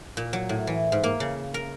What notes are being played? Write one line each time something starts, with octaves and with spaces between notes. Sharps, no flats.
A#2
F#3
A2
E3
G#2
A#3
C#3
A#4